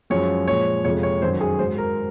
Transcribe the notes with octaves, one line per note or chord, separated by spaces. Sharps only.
F#2 F3 G#3 C#5
A#2 F3 G#3 C#5
F2 C3 F3 G#3 C#5
C#5
F#2 D#3 F#3 C5
G#4
G#2 F#3 C5
A#4